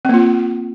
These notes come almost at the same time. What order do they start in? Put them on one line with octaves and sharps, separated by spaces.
C4 A#3 F4